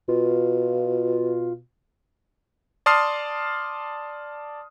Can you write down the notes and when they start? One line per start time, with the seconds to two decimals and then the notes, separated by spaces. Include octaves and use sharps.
0.08 B2 F4
2.86 D5 A5 C6 D#6 F6 C7